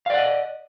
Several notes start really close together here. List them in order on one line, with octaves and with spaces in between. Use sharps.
F5 D5 F#5 D#5